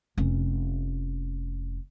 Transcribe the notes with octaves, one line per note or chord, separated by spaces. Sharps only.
F1 C#4